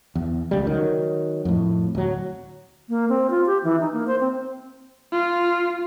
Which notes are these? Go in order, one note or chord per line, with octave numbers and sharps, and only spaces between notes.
E2
C#2 G3
D#3 F#3
F2 A2
D1 F#3
A#3
C4
F4
G4
E3
D#4
A#3
C5
C4
F4